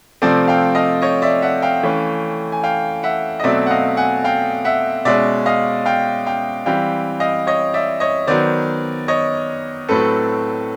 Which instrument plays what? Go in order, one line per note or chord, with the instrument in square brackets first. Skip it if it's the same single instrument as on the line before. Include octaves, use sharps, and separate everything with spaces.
[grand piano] C3 F3 A3 C4 C5 D5
F5 G5
D#5 F5
C#5 D#5
D5 E5
E5 F#5
F5 G5
E3 A3 C#4
G#5
F5 G5
E5 F#5
D#5
B2 F#3 A3 C4 D5 E5
F#5
D#5 F5
F#5 G#5
F5 G5
E5 F#5
B2 G#3 C#4 D5 E5
D#5 F5
F5 G5
F5 G5
E3 G3 C4 F5 G5
D#5 F5
C#5 D#5
D5 E5
C#5 D#5
D#3 F#3 B3 C5 D5
C#5 D#5
A2 F#3 A3 C4 A4 B4